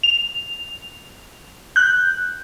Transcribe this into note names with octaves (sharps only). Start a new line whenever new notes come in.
F7
F#6 G6